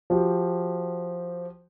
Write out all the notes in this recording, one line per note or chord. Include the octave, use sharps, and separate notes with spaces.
F3 F#4 G4